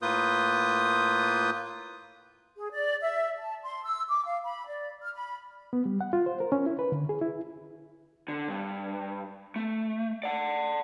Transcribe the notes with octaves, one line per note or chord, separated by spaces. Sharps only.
A2 A#3 F4 B4 D#6 G6
G#4
D5
E5
A5
C6
E6
D6
F5
B5
D5
F6
B5
B3
G3
F#5
F4
C5
A#4
C#4
E4
B4
D3
G#4
E4
D3
G2
A3
D5 F#5